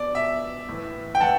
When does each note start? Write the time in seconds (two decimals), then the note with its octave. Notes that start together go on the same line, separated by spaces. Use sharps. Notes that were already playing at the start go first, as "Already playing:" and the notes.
Already playing: B2 D5
0.15 B2 E5
0.69 A2 E3
1.15 G5
1.20 A2 E3 F#5 A5